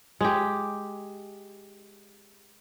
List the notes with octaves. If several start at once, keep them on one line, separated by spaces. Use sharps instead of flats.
G#3 G4